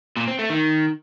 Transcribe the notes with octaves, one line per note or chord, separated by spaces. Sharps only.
A#2
C4
A3
D#3